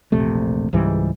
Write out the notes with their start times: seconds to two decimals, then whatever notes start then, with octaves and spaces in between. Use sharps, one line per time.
0.12 E1 A#1 C3 A3
0.73 C#2 G#2 E3 G3